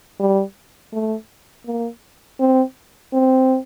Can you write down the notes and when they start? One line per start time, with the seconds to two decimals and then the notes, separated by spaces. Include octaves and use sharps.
0.20 G3
0.93 A3
1.66 A#3
2.40 C4
3.13 C4